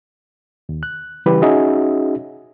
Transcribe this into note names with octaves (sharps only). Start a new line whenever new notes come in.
D#2
F#6
C#3 E3 G3 E4 G4 B4
C#4 D#4 F#4 G#4 D#5 E5